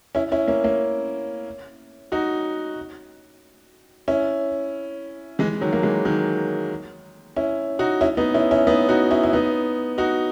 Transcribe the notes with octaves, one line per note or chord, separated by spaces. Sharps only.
C#4 E4
C#4 E4
A#3 C#4
A#3 C#4
D#4 F#4
C#4 E4
E3 G#3
D#3 F#3
A#3
E3 G#3
D#3 F#3
C#4 E4
D#4 F#4
C#4 E4
B3 D#4
C#4 E4
C#4 E4
B3 D#4
D#4 F#4
C#4 E4
E4
B3 D#4
D#4 F#4